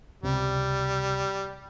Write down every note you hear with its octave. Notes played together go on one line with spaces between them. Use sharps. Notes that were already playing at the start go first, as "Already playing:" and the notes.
C#2 C3 G3